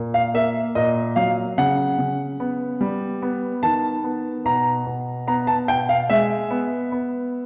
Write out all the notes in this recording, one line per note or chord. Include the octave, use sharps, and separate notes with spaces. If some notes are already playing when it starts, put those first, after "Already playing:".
Already playing: A#2
F5
A#3 E5
A#2 D#5
F#3 F5
C#3 F#5
C#3
B3
G3
B3
D#3 A5
B3
B2 A#5
B2
B3 A#5
A5
B2 G5
F5
G#3 E5
B3
B3